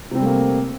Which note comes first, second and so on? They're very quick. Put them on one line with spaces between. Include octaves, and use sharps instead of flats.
C3 C4 G3 A3 A#3